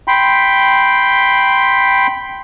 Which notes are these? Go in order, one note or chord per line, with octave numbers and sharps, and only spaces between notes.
G5 B5 C6